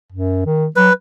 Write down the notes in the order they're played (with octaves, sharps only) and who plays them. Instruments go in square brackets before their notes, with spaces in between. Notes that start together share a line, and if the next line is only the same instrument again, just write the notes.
[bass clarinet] F#2
D#3
[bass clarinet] F#3 [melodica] B4